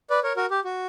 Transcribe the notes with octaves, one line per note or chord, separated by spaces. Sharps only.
B4 D5
A#4 C#5
F#4 A#4
G4
F#4